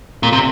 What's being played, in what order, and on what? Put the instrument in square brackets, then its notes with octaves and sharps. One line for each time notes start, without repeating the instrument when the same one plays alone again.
[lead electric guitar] A#2 [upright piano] A#3 C4
[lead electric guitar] C3